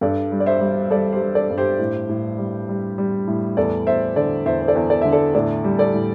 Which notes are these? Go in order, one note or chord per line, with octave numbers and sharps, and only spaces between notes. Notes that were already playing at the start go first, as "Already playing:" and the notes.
G2 A4 D5
G3
D5
C5 E5
G3
G3 A4 D5
G4 C5
G3
A4 D5
G2
G4 C5
A2
A2
G3
G3
G3
A2
E2 A4 D5
E2 C5 E5
D3 A4 D5
E2 C5 E5
C5
A4 D5
E2
A4 D5
D3 E5
A4 D5
A2 A4 D5
G3
A4 D5
A2